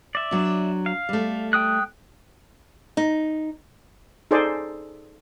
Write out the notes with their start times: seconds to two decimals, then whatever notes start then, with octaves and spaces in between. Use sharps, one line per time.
0.15 D5 E5
0.31 F#3 D4
0.86 F5
1.09 G3 A3
1.53 G5 D#6 F#6
2.97 D#4
4.31 D#4 G#4 A4 C5 D5